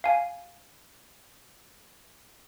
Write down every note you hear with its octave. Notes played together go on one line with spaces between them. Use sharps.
F5 G#5